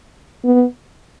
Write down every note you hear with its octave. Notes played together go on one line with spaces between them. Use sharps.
B3